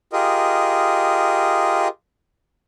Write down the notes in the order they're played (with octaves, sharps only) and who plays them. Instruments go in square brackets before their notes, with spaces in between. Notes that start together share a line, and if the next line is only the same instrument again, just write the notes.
[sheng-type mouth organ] F4 G4 G#4 A#4 D#5